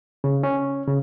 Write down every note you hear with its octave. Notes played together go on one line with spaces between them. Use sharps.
C#3
C#4
C#3